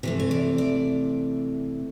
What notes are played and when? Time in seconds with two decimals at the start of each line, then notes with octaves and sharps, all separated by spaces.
0.03 C3 E3 A3 C#5
0.20 C#5
0.31 D5
0.58 D5